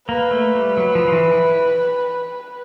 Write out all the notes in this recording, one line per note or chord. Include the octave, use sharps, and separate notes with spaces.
A#3 B4
A3
G3
F#3
F3
F3
E3